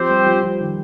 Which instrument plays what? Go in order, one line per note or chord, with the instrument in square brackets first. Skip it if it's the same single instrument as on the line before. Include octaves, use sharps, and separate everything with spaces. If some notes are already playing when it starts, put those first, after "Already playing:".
Already playing: [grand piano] F3 [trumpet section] C4 G4 C5
[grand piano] G3
F3
F3
D#3